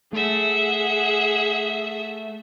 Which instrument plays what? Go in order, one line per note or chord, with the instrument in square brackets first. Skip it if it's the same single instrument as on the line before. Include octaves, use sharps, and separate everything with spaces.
[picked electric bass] A3 [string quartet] G#4 E5 F#5